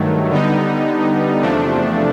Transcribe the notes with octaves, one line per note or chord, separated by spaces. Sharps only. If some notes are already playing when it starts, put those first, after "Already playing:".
Already playing: G2 D#3 F#3 A3
D3 G3 B3 D#4
E2 C3 F3 A3 D4